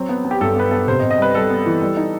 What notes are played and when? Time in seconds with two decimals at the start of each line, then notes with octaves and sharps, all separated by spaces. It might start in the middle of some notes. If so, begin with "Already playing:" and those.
Already playing: F#3 C4
0.09 B3
0.25 B3
0.31 G4
0.41 G2 A4
0.56 B3 B4
0.71 B3 A4
0.88 C3 C5
1.00 D#5
1.03 C3
1.10 D#5
1.18 G3 B4
1.34 G3 A4
1.50 B3
1.66 E3
1.82 G3
1.97 D#4